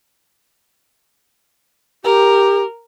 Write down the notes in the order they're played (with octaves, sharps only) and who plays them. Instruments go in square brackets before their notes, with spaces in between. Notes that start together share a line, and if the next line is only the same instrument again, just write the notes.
[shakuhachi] G4 [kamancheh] A#4